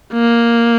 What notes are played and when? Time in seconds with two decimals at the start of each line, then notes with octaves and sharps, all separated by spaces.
0.13 A#3